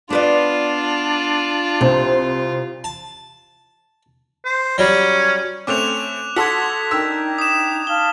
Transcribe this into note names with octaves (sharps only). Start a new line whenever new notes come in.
B3 D4 F4 B4 D5
C2 C3 C5
A5
C5
F#3 G3 C#4
A3 C4 C#4 D6 F#6 F7
F#4 A4 C6 D#6 G#6 B6
D4 D#4 A#4 G5 E6
D#6 E7
F5 A5 F6 G7